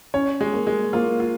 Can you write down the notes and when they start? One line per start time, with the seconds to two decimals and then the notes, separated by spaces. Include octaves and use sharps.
0.14 C#4 C#5
0.41 G#3
0.53 A#3
0.67 G#3
0.93 A#3 F4
1.20 F4